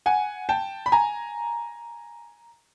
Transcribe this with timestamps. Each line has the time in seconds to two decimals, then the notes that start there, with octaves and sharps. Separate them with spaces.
0.06 F#5 G#5
0.49 G5 A5
0.86 B5
0.92 G#5 A#5